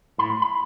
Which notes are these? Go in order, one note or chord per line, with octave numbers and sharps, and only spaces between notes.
A2 B5
B5